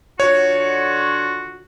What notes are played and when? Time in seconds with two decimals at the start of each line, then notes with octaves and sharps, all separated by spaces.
0.20 D3 F4 F#4 C#5